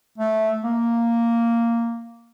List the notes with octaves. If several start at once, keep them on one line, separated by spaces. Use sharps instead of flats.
A3
A#3